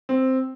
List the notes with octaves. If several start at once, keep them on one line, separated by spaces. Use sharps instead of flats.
C4